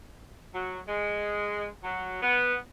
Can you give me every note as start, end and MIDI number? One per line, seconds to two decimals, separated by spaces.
0.54 0.79 54
0.88 1.67 56
1.84 2.20 54
2.22 2.54 59